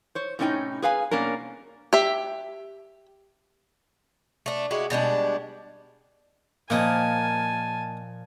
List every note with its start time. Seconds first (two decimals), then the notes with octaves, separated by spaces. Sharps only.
0.15 C5 C#5
0.39 A2 C3 C#4 D#4 G5
0.82 G#4 B4 F5 G#5
1.11 B2 A#3 C#4 D4 A#4
1.93 G4 E5
4.46 A3 D4
4.71 G#3 E4 F#4 G4
4.90 B2 G3 G#3 D4
6.70 A#2 F3 A#3 D#4 G#5 A5